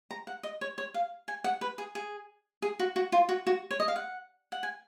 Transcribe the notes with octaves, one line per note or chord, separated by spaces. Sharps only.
A#5
F#5
D#5
C#5
C#5
F5
G#5
F#5
B4
G#4
G#4
G#4
F#4
F#4
F4
F#4
F#4
C#5
D#5
F5
F#5
F#5
G#5